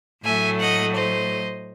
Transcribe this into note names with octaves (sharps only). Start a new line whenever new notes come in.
A2 F#3 A3 E5 G#5
D#5 F#5
C5 D#5